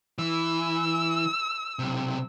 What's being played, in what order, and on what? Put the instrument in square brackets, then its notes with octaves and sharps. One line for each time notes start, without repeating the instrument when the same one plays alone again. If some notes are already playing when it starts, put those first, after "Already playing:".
[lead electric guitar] E3 [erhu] E6
[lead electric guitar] B1 C3